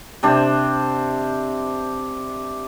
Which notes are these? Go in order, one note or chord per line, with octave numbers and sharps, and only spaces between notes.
C3 D4 C5